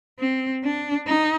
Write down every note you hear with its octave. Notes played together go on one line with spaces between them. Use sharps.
C4
D4
D#4